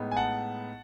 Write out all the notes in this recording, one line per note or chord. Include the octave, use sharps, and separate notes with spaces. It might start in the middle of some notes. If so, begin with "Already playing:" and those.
Already playing: A2 G#3 B3 D#4
G#5
F#5 A5